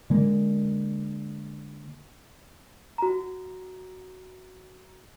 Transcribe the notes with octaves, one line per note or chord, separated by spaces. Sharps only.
D3 G#3 A#3
F#4 A#5